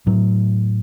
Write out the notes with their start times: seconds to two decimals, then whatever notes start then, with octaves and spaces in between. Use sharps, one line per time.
0.07 A2 F#3